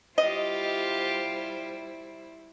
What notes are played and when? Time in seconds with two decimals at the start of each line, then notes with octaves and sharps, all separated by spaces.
0.18 G3 E4 F4 G4 C5 D#5